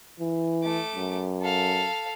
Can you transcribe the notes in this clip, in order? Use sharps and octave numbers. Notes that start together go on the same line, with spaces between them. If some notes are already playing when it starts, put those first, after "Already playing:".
E3
A3 D6
F#2
A4 F5